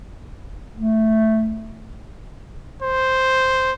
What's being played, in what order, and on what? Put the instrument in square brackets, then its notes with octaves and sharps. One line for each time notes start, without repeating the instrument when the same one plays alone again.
[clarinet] A3
[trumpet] C5